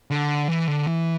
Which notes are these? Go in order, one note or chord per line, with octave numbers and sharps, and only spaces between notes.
D3
E3
D3
E3